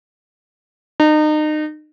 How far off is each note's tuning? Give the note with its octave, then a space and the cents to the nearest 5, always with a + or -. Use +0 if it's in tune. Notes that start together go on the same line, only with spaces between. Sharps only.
D#4 -30